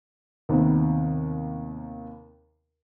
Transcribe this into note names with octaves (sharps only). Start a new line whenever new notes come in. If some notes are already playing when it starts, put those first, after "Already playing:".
D#2 C3 D#3 B3